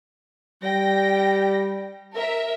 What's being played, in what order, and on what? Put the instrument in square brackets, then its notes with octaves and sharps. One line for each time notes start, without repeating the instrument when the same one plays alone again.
[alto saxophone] G3 [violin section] G5 A#6
[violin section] A#4 E5